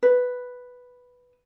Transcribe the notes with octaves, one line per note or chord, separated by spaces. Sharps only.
B4